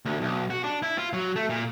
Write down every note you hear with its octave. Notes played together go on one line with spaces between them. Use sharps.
D2
B1
F#4
D4
E4
F4
F#3
A3
A#2